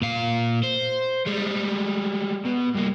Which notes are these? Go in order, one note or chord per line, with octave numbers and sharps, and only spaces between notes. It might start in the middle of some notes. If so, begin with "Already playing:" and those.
A#2 F5
C5
G3 G#3
B2
G2 A#3